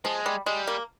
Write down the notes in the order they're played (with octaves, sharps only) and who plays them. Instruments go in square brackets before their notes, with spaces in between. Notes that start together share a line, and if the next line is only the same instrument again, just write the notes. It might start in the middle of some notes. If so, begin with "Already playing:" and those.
[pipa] F3 [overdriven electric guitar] G#3
[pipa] G3
[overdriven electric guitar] G3 [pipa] G#3
[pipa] A#3